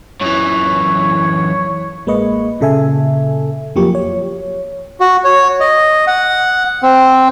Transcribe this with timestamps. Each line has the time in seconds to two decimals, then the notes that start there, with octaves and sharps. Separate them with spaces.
0.21 F#2 E3 C#5
2.06 A1 G#3 A#3 B4 D#5 C#6
2.60 A#2 C#3 A4 E5 G#5
3.75 F2 F3 F#3 A#3 G4 C#6
3.95 C#5
5.00 F#4
5.24 C#5
5.60 D#5
6.07 F#5
6.82 C4